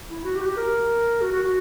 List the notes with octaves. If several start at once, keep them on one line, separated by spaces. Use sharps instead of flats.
E4
F#4
G4
F#4
G4
A#4
F#4
F#4
F#4